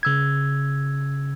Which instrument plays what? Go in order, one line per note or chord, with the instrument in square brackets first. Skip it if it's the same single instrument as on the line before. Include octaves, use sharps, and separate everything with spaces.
[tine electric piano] C#3 E6 G#6